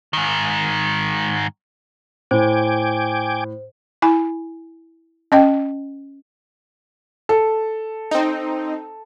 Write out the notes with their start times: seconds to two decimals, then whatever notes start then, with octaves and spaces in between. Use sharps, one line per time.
0.13 G#2 D#3
2.31 A2 C5 G5 G#5 D6
4.02 E4 G#5
5.32 C#4 D#5 G5
7.29 A4
8.11 C4 D#4